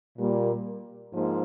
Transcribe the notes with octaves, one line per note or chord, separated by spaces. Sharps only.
A#2 G3 A#3
G#2 F3 A#3